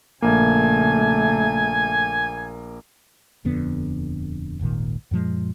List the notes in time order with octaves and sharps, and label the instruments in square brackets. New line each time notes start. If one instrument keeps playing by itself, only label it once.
[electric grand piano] A#1 A#3 [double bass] C#3 A3 [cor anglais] G#5
[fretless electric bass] D#1 F2 D3 B3
D#1 G#1 A#2 D#3
F#2 A#2 F3 G#3